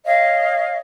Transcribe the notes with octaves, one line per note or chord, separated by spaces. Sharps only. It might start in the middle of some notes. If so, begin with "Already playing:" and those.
C#5 D#5 F5